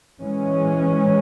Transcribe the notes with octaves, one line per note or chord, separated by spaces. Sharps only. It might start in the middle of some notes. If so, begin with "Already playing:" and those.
E3 G#3 C#4